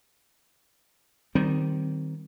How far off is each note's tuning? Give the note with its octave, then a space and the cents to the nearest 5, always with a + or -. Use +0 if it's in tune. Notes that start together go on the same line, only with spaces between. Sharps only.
D#3 +0 G3 -20 C4 +0